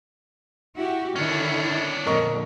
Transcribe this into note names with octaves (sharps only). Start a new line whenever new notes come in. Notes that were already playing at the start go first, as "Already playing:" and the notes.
E4 F#4 G4
D3 D#3 C#4 D4 E4
F2 A#2 D3 A#4 D#5 C#6